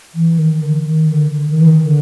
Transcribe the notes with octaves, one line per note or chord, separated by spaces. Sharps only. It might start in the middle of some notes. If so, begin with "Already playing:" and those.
E3
D#3
D3
D#3
D3
D3
D#3
E3
D#3
D3